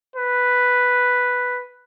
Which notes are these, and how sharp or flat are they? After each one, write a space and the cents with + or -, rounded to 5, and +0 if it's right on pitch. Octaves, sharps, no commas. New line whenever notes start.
B4 +0